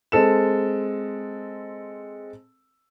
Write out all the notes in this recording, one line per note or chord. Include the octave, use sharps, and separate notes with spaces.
G#3 C4 A4 E7